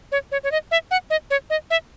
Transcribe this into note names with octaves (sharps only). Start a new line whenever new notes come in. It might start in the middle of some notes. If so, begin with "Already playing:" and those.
C#5
C#5
C#5
D#5
E5
F#5
D#5
C#5
D#5
E5